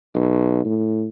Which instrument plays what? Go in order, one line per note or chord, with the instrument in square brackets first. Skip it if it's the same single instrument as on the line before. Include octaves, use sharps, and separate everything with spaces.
[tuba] B1
A2